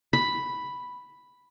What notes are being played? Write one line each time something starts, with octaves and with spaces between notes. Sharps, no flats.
B5